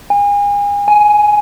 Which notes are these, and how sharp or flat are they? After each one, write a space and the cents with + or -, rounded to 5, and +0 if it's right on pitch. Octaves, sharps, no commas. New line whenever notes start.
G#5 -35
G#5 +10